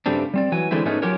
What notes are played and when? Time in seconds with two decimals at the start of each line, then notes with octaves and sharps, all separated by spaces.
0.06 G2 C#3 G3 A3 C4 D4
0.34 G3 C4 D5
0.52 E3 F#3 G#5
0.71 D3 E3 G#3 A3 C4 E4
0.85 G#2 G#3 A3 B3 C#4 D#4
1.02 F#3 C#4 F4 G4 A#4 C#5